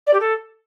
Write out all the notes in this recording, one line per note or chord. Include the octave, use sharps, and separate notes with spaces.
D5
G4
A4